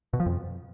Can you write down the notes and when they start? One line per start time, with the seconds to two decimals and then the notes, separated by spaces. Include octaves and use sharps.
0.13 B2
0.20 F3
0.26 F2